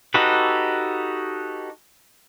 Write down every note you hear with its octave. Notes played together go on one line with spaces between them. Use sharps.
D#4 F#4 G4 A4 B4